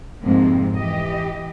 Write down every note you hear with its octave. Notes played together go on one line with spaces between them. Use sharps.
F2 G#2 C3 A#3 C4
E3 G4 D#5